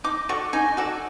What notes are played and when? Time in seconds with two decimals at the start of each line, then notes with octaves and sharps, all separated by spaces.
0.04 D#4 D6
0.29 F#4 A4 D5 C#6
0.53 D#4 G#5
0.77 F#4 A4 D5